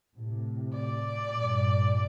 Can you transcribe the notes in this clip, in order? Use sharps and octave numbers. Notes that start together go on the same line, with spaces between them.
A2 C3
D5
G2 A#2